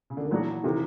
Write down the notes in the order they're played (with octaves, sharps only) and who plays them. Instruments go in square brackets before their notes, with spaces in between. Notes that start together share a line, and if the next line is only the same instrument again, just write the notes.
[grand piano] C#3
D3
D#3
[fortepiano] A#2 F#3 B3 D4 F#4 [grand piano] E3
[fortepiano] C3 D#3 [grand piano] E3